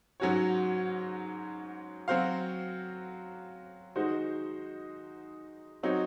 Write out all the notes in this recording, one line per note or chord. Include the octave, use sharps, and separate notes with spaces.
G#2 F#3 C#4 F#4 C#5
F#3 C4 F#4 C5 F5
D#3 G#3 D#4 F#4 C5
F#3 C4 D#4 F#4 C#5